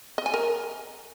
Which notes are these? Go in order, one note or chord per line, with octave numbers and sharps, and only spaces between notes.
D#5
G#5
A#4